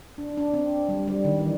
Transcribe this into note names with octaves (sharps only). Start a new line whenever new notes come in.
D4
D4
C4
G3
G3
D#3
E3